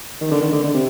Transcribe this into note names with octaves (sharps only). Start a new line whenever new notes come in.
D#3
D3
D#3
D3
D3
C3